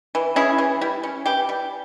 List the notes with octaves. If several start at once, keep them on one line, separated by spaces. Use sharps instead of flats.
E3
C#4 E4 G#4
E3
G3 E4
C#4
E3 G4
G3